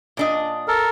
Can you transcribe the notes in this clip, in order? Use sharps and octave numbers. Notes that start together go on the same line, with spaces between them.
A#2 D4 D#5
A4 A#4